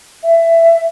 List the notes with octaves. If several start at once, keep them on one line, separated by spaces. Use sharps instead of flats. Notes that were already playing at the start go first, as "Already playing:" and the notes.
E5